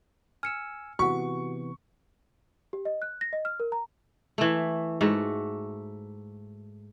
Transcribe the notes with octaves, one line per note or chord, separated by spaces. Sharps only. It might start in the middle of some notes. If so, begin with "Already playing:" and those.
G#5 E6 F6 C#7
C3 E3 B3 F#4 F#5 C#6
G4
D#5
F#6
A#6
D#5
F6
A#4
A#5
E3 A3
G#2 A3 F#4